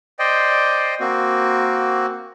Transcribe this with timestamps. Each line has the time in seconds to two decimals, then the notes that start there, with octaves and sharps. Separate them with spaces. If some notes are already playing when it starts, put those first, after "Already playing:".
0.19 C5 D5 D#5 G5
1.00 A#3 C4 F#4